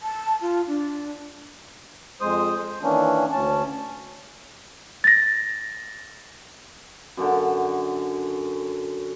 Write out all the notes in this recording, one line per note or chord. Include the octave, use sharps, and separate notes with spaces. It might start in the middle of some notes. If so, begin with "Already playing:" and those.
A5
F4
D4
F2 G#3 C5 D#6
C5
D#3 E3 A#3 C#4 D4
D2 C#4 A5
A6 A#6
F#2 D3